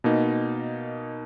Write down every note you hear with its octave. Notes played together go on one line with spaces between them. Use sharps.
B2 A#3 D#4